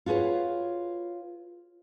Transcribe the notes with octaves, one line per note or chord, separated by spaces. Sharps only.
F4 F#4 G#4 B4 C#5